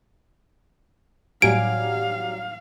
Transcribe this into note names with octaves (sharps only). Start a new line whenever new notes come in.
A2 F#3 G3 F5 G#5 G#6 D7